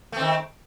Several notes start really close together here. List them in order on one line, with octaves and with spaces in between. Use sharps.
A3 C4 D#3